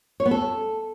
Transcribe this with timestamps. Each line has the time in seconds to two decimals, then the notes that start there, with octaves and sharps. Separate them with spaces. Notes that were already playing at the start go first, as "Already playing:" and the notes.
0.20 C#5
0.26 B3
0.31 A4